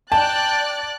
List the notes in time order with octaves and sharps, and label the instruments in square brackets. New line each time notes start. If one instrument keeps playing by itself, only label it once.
[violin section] D5 F#6 A6 [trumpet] G5 [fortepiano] A5